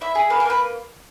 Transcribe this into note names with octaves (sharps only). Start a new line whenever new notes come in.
E4 E5
G#4
A#3 B4
A#4
A#3 B4